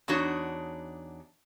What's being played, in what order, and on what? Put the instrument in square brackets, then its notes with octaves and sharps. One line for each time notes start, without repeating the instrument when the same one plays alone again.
[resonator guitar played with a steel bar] E2 D4 D#4 F#4 C#5